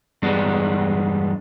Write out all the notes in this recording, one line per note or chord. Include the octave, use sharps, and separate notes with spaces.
E2 G2 G#3 B3 D4